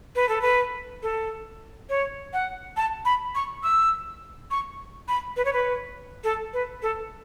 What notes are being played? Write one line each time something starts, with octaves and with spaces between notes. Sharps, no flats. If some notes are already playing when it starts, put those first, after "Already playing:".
B4
A4
B4
A4
C#5
F#5
A5
B5
C#6
E6
C#6
B5
B4
C#5
B4
A4
B4
A4